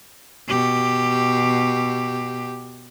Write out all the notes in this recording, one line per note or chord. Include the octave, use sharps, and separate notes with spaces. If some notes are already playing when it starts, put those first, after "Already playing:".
B2 G4